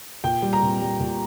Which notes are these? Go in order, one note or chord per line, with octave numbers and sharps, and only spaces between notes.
A#2 G5
G3
A#5
A#2
G3
A#2